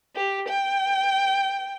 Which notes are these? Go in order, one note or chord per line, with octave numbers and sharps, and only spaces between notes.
G4
G5